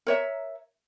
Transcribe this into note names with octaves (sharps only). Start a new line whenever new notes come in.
A#4 C#5 E5